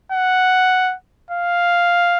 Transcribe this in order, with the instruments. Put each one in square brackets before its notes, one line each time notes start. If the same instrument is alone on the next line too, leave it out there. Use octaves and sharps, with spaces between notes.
[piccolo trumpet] F#5
F5